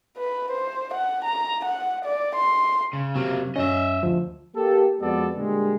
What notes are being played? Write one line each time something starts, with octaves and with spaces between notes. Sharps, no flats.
B4
C5
F#5
A#5
F#5
D5
C6
C#3
C3 F#3 A#3
F#2 C#4 D#5 E5
D2 F3
A#3 G4 A4
F2 G#3 B3 F#4 A4 D5
A#2 D3 G3 G#3